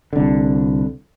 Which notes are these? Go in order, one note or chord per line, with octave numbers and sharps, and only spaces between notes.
C2 D3